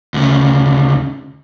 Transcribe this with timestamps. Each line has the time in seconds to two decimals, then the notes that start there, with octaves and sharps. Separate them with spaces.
0.14 D2 C#3